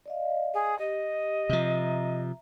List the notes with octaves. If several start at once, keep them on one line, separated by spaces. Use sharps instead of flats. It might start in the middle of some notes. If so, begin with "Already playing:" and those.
D5 D#5 F5
G#4
G4 D#5
C3 F3 E5 A#5